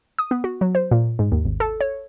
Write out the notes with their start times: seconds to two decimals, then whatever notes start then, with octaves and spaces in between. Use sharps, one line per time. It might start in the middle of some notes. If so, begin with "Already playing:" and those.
0.19 D#6
0.31 B3
0.44 F#4
0.61 F#3
0.75 C5
0.91 A#2
1.19 G#2
1.32 D#2
1.45 G#1
1.60 A4
1.81 C#5